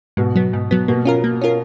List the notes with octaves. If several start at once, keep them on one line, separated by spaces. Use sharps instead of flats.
G#2 B2
F#3 B3
G#2
F#3 B3
B2 A#3
C#4 F4 A#4
A#3
C#4 F4 A#4